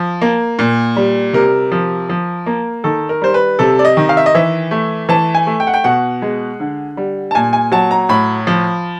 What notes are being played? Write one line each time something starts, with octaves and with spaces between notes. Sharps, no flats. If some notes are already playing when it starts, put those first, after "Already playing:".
Already playing: F3
A#3
A#2
G3
C3 A#4
F3
F3
A#3
D#3 A4
A#4
G3 C5
B4
C3 A4
D5
D#5
D#3
F5
E5
D#5
E3 E5
A3
E3 A5
G#5
A3
G5
F#5
G5
B2 F#5
G#3
D3
G3
A5
A#2 G#5
G#5
F#3 A5
A#5
A2 B5
F3